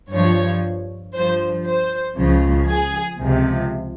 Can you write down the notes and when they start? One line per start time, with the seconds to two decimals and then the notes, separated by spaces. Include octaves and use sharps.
0.12 G2 F3 C#5
1.15 G2 F3 C5
1.66 C5
2.17 C#2 C#3 F3
2.69 G#4
3.20 C#2 C3 F3